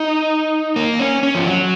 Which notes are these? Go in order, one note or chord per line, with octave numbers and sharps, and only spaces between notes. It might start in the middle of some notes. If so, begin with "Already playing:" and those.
Already playing: D#4
A#3
C#4
C#4
F3
F#3